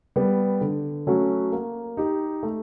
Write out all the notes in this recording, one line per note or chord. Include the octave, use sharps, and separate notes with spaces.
G3 B3
D3
F#3 A3 C#4 F#4
A#3
D#4 G4
A3